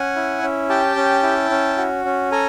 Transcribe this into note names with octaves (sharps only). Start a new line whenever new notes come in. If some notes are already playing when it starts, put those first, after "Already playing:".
Already playing: C#4 F#5 G#5
E4
C#4
G4 G5 A5
C#4
E4
C#4
F#4
C#4
A4 G#5 A#5